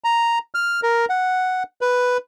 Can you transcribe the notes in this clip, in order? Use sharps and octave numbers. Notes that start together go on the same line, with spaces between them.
A#5
F6
A#4
F#5
B4